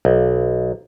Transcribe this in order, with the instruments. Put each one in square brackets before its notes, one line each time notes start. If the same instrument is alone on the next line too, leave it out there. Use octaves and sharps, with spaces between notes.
[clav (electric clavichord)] B1